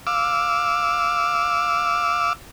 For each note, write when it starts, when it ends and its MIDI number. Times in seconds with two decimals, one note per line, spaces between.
0.07 2.33 77
0.07 2.33 86
0.07 2.33 88